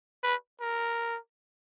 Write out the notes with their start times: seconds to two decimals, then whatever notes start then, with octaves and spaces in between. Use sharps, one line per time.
0.24 B4
0.61 A#4